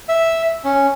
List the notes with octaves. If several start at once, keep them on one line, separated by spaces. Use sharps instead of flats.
E5
C#4